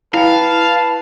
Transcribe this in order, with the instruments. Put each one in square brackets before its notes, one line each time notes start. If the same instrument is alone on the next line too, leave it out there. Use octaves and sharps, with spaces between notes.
[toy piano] E4 G5 [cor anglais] B4 [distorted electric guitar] F5 [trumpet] A5